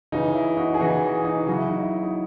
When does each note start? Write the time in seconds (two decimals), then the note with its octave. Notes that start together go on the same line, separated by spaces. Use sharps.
0.12 C#3 E3 D#4
0.35 E4
0.57 D#4 F#4
0.74 G#4
0.80 C#3 E3 D#4 F#4
1.24 D#4 F#4
1.47 C#3 F#3 F#4
1.58 E4
1.68 D#4
1.80 E4
2.03 D#4